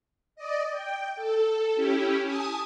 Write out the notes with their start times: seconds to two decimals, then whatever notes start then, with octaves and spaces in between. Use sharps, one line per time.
0.36 D5 D#5
0.71 G5
1.16 A4
1.75 C#4 E4 G4
2.24 G#5 A5 D#6